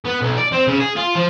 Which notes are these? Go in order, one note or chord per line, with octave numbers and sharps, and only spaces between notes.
B3
B1
D5
C4
C#3
G#4
F4
F3